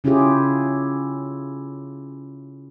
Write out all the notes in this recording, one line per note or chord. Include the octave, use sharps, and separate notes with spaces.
C#3 C#4 E4 F4 G4 G#4